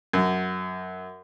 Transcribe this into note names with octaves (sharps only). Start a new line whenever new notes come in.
F#2